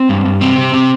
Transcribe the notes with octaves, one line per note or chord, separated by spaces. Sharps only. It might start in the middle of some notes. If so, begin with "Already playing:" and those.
Already playing: C4
G2
G2
C3 C4
C3
C3